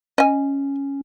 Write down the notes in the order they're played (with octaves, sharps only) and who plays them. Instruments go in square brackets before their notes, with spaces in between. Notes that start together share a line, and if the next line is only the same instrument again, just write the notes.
[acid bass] C#4 [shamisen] D#5 G#5